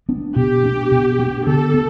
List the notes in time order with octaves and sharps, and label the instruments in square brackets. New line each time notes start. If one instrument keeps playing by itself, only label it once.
[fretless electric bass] B3 D4
[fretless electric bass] B2 [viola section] G4
[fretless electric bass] B3 D4
B2
B3 D4
[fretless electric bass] D3 [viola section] A4
[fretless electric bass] B3